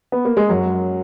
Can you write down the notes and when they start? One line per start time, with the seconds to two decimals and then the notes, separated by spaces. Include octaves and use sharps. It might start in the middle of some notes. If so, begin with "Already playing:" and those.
0.12 B3
0.25 A#3
0.37 G#3
0.49 F#2 F#3